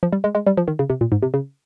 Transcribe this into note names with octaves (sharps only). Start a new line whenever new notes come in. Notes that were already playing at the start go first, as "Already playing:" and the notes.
F3
G3
G#3
G#3
G3
F3
D#3
C#3
C3
A#2
G#2
C3
C#3